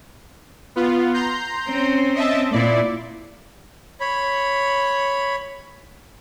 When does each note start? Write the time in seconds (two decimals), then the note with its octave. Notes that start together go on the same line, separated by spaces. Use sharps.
0.76 B3 F4
1.14 A#5 C6 G6
1.68 C4 C#4
2.15 D#5 E5 A5
2.52 A#2 E4 D5
4.00 C#5 B5